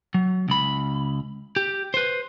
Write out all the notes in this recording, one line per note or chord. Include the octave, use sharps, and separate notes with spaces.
F#3
C#2 B5
G4
B4 C5